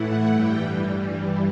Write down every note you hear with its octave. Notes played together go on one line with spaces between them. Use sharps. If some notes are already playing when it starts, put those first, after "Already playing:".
Already playing: A2 E3 A3 E4 F#5
G2 E3 G3 G5